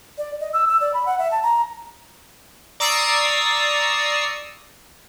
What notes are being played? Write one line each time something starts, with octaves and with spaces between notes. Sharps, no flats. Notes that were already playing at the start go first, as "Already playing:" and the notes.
D5
D#5
E6
E6
D5
B5
F#5
E5
A5
A#5
D5 A#5 C#6 D#6 E6 C7